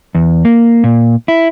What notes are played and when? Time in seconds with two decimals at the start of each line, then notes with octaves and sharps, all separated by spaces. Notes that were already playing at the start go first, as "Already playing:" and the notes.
0.15 E2
0.45 A#3
0.84 A#2
1.28 E4